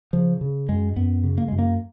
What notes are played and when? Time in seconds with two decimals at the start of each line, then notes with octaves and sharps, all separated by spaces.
0.13 C#3 F3
0.41 C#3
0.69 F#2 G#3
0.96 F#2 B3
1.24 C#3
1.38 A#3
1.48 F#2 G#3
1.59 A#3